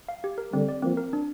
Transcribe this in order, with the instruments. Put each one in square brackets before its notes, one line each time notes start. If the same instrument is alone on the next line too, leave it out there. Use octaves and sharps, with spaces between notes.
[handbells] F5
G4
A#4
[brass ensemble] D3 G3 [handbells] C4
[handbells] D5
[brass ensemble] F3 A#3 [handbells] C4
[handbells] A#4
D4